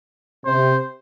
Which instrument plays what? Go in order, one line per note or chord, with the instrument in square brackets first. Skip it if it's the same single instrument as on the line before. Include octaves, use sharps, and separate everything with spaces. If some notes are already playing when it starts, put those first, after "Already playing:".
[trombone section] C3 [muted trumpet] C5